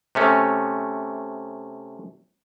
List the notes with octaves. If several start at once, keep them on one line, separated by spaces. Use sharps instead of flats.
C3 A3 C#4